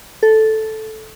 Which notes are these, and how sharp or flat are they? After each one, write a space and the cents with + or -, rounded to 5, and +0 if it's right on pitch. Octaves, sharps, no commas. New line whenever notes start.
A4 -5